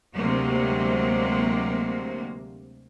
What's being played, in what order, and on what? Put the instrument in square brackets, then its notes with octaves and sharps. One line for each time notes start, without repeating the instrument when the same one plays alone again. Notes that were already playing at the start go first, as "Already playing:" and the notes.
[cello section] D2 C3 F#3 G#3 A#3